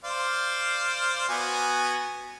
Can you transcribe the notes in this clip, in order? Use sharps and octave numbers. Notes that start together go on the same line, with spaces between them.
C5 D5 F5
B3 F#4 G#5